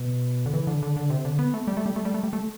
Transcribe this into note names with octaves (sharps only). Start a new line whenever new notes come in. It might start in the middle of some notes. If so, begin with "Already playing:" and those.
Already playing: B2
D3
E3
D3
D3
D3
C3
D3
B3
A3
G3
A3
G3
A3
G3
A3
G3
A3